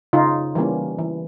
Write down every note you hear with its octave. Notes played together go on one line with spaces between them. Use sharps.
C#3 D#4 F4
E3 G3 A#3 C#4
E3